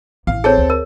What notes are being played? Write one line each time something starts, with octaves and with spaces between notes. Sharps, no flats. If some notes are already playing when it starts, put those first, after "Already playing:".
A1 F5
C4 G#4 A4 C#5
D2
A#4